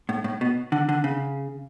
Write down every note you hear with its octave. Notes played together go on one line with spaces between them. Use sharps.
A2
A2
B2
D3
D3
C#3